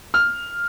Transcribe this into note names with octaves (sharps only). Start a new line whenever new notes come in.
F6